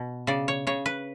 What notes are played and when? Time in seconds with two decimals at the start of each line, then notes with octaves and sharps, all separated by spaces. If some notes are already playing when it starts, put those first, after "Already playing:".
Already playing: B2
0.27 C#3 D5
0.48 C#5
0.67 C#3 C#5
0.86 B4